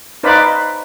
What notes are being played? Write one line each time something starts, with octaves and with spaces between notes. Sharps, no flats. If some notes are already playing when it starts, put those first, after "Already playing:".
D#4 B4 C5 D5 F5 B5